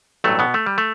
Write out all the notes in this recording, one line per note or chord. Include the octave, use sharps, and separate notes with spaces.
A1 G2 F#3 A3
B2 B3
A3
G3
A3